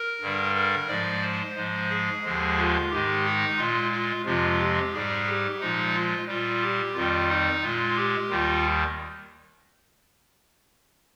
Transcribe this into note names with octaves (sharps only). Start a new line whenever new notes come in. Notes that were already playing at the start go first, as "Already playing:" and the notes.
Already playing: A#4
G2 D3 G3
A#4
G#2 F3 G#3 D5
C5
G#2 F3 G#3
G#4
D#2 D3 F3 G#3
F4
G#2 D#3 G#3 G4
D#4
A#2 G#3 F4
F4
F2 C3 F3 G#3 F4
G4
G#2 G3 G#4
G4
A#2 F3 G#3 D#4
F4
A#2 G3 F4
G4
F2 D#3 G3 F4
D#4
A#2 G#3 F4
G4
D#2 D#3 G3 F4